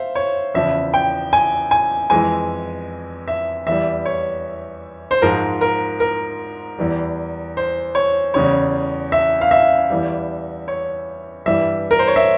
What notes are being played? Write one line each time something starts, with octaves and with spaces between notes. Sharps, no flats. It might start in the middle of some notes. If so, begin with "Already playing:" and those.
Already playing: C5 E5 F5
C#5
E2 C#3 F3 E5
G5
G#5
G#5
F2 E3 G#3 G#5
E5
E2 E3 G3 E5
C#5
C5
G#2 F3 G#3 A#4
A#4
A#4
E2 E3 G3
C5
C#5
E2 C#3 G3 C#5
E5
F5
E5
E2 E3 G3
C#5
G2 E3 G3 E5
A#4
C5
C#5
E5